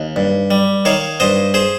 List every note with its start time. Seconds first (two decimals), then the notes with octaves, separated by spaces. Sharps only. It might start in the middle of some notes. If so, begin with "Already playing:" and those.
Already playing: D#2
0.16 G2
0.51 G3
0.85 D#3 C#5 F5
1.20 G2 C5 D#5
1.54 G#4 C5